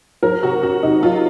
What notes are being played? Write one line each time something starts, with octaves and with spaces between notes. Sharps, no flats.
F#3 A#4
C3 F#4
C#4 F#4
C3 D#4
F#3 F4